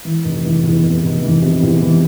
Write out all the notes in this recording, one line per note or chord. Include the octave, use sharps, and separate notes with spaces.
E3
F1
E3
E2
F1
F1
E3
C3
E2
E3